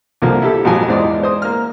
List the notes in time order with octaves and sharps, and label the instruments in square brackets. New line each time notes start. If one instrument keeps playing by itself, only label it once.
[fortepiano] C2 D3 F3 A#3
E4 G4 A4
A#1 F2 G#2 F3 F#3 G#5
E2 G#2 G#3 C5 D5
C5 D#6
A#3 F6